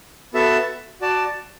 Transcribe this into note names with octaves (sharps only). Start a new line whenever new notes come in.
B3 F#4 A4 E5 A5
F#4 D5 A5